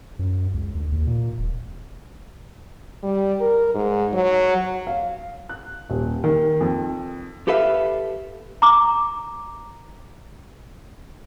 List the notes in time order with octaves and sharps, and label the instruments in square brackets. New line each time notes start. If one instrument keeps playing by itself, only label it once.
[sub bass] F#2
C#2
D2
D#2
A#2
D#1
[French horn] G3
A#4
G#2
F#3
[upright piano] F5
F#6
D#1
D#3
F2
[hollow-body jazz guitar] G4 A4 B4 E5 F5
[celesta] A#5 D6